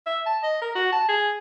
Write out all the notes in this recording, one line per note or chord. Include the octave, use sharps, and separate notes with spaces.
E5
A5
D#5
A#4
F#4
A5
G#4